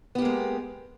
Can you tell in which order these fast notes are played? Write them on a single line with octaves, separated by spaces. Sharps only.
B3 G4 A#3 G#3